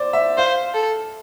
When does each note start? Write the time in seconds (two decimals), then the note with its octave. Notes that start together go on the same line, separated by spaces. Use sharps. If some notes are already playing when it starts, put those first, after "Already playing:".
Already playing: C5 D5
0.13 E5
0.38 C5 F5
0.75 A4